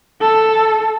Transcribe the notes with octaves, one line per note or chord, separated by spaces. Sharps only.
A4